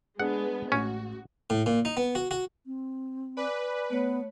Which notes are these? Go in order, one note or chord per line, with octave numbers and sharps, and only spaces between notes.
G#3 B3 D4 G#4 B4 F#5
A1 C#4 F#4
A2
A#2
D#4
B3
F#4
F#4
C4
B4 D5 G#5 D6
A3 B3 C#5